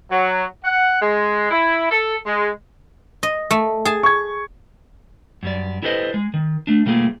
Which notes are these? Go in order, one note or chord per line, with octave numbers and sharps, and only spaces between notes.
F#3
F#5
G#3
E4
A4
G#3
D#5
A3
G#4 A5
C#6 G#6
F#2 G3 D5
E4 G4 A4 B4 C5 D#5
G#3
D#3
A3 D4
B2 G3 A3 A#3 F4 G#4